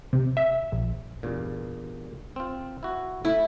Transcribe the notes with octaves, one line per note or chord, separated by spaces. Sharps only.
C3
E5
A#1
E2 G2 A#2
C4 F4
E4 F#4
A3 E4